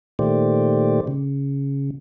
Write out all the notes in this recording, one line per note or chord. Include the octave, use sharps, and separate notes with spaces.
A#2 D#3 A3 G4 C5 D5
C#3